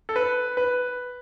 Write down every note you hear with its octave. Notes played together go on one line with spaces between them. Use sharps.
A4
B4
B4